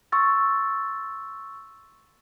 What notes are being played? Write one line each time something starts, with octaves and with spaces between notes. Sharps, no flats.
C6 C#6 E6 A6